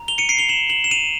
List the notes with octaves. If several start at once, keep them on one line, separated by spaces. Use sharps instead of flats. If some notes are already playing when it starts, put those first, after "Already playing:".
Already playing: A#5
F7 G7
C#7 D#7
C7 D7
F7 G7
E7 F#7
E7 F#7
E7
D#7 F7